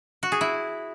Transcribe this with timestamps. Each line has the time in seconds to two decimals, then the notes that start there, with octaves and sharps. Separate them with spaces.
0.23 F#4
0.32 G#4
0.41 E4